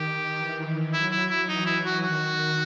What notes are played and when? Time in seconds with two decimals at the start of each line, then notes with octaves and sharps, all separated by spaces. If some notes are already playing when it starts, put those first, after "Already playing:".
Already playing: D#3 G4
0.38 E3
0.93 F#3 E4
1.12 E4
1.30 E4
1.48 E3 D#4
1.66 E4
1.85 F#4
2.03 D#3 F#4